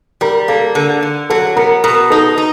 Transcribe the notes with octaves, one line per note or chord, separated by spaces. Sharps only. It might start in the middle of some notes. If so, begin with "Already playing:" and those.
G3 A#4
A#3 A4
D3 A4
D3
F#3 A4
B3 A#4
B2 A#4
D#4 A4
D#4